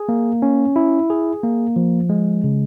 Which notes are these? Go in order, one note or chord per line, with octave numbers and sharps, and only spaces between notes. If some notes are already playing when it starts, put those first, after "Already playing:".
Already playing: G#4
A#3
C#4
E4
G#4
A#3
F3
G#3
C#3